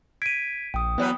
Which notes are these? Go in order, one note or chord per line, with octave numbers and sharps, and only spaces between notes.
G#6 B6 D7 D#7
A#1 G5 D#6
E3 F#3 B3 B4